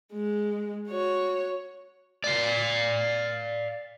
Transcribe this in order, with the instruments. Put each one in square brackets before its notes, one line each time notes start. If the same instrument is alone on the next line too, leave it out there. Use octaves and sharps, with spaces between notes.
[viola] G#3
F#4 C#5
[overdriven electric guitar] D5 F5